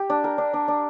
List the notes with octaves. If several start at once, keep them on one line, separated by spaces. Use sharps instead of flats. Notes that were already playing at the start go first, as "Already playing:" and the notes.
Already playing: G4
D4
A#4
D4
D4
D4